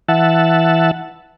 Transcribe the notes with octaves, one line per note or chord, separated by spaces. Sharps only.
E3 E5 F#5 A5